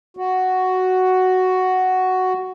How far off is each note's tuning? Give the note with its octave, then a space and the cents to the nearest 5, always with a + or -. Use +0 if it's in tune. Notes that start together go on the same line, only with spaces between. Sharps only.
F#4 +5